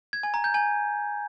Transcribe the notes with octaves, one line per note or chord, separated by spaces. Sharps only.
G#6
G#5
A#5
G6
G#5